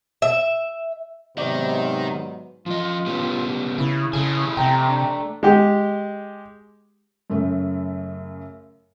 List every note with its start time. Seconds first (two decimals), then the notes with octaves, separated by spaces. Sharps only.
0.22 E5
1.37 G#2 C3 D#3 F#3 B3 D5
2.66 F3 F4 D#5
3.06 G3 B3 C#4
3.78 C#3 E4
4.13 C#3 A3 A4 G#5
4.57 C3 G5 A#5
4.86 D4
5.43 G#3 G4
7.30 F#2 C#3 A3